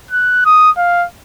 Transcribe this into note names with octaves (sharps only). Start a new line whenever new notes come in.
F#6
D#6
F5